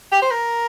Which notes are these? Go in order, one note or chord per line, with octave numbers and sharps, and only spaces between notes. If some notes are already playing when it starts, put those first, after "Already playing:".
G4
C5
A#4